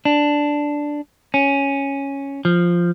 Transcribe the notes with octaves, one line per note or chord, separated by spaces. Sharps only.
D4
C#4
F3